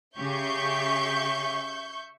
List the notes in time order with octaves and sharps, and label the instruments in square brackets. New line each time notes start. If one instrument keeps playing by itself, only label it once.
[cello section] C#3 G4 G#4 [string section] E5 C#6 G6